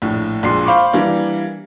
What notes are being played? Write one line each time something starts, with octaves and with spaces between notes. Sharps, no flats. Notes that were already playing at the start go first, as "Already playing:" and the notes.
A#1 A2
A#1 A#2 G#3 C6 C7
C5 F5 B5 C#6 D6
E3 G3 A#3 D4